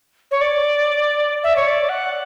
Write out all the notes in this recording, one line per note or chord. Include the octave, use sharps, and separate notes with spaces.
C#5
D5
E5
C#5
D5
F#5